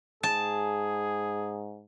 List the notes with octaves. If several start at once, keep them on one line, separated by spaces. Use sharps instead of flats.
G#2 G#4 A5